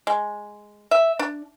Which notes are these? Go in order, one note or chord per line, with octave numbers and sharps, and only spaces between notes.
G#3
E5
D4